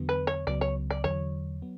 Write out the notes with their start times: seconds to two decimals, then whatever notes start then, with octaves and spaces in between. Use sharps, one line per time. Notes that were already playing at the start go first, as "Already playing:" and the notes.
Already playing: E2 D3 F#3 B3
0.09 B4
0.27 C#5
0.47 C#2 C#3 F#3 B3 D5
0.61 C#5
0.91 D5
1.04 E2 D3 F#3 C#5
1.62 F#3 B3